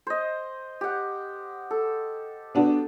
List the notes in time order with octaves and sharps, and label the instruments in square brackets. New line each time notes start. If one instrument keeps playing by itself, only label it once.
[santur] C5 D#5
G4 F#5
A4
[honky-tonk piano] B3 D4 F#4